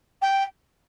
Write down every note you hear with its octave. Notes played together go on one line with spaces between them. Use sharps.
G5